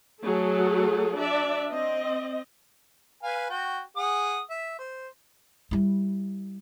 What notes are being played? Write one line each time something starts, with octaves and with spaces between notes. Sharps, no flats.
F#3 A3 G#4 A4
D4 D5 E5
C4 D#5
B4 F5 G#5
F#4 G5
G#4 F#5 D#6
E5
C5
G3 E4